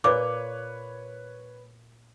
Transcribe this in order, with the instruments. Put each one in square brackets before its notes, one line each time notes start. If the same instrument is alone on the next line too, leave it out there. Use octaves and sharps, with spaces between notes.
[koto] A#2 [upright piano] B4 C#5 [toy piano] D6